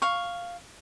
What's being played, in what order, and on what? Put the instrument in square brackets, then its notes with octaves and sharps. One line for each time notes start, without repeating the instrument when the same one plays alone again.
[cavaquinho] F5 C#6